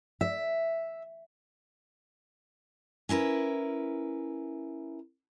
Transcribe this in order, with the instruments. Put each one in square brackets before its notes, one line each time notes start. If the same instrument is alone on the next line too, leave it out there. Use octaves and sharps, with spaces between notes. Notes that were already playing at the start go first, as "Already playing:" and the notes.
[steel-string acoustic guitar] E5
C#4 E4 A#4 B4